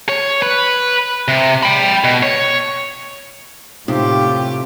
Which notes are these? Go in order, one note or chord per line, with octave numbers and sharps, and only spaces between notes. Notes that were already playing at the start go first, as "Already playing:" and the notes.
C#5
B4
C3
G5 B5
B2
C#5
A2 C3 D#4 F4 G4